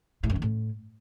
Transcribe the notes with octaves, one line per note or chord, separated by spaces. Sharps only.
A2
F#2
D#3
A2